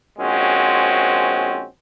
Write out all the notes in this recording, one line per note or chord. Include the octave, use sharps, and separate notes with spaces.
A#1 G#3 C4 C#4 F#4